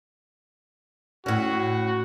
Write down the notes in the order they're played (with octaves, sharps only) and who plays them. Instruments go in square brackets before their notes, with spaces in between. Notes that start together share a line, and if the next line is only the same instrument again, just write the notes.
[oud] A2 C#4 [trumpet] F#4